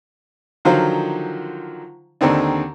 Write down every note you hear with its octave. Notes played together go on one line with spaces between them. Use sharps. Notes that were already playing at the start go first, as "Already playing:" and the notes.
D3 D#3 F3 F#3 C5 F5
D#2 D3 D#3 C4 D4